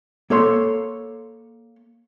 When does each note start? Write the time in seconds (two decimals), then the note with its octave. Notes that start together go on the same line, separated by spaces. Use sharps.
0.30 A#3 A4 C#5 C6